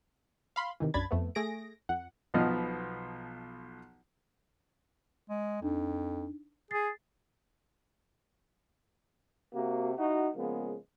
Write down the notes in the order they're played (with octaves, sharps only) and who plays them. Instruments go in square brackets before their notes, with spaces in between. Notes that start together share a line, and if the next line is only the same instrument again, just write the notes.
[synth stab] F5 B5 C6
C3 D#3 E3
B1 F#2 D4 B5 G#6 A6
F2 A3 B3
A3 G#4 A#6 D7
F2 F#5
[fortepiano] B1 B2 F3 B3 D#5 F6
[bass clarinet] G#3
[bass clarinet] F2 [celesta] D4 D#4
[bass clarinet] G#4 [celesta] A6 C7
[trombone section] C3 A#3 F#4
D#4 E4 F#4
C#3 F3 G#3 A#3 B3